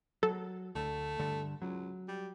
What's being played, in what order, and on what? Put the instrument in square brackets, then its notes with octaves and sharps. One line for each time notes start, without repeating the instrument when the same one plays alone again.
[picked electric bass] F#3 [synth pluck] A4
[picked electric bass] D2 [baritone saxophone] A3
[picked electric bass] G2 D3
[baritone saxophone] C#2 [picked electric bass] F#3
[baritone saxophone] G3